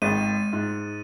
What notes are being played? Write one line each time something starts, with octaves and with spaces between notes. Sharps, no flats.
G#1 D#3 G#3 D#4 A6 D#7
G#2